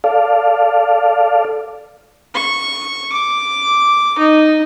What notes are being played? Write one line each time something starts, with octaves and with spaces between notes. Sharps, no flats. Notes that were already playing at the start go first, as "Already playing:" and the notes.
A4 D5 F5
C#6
D6
D#4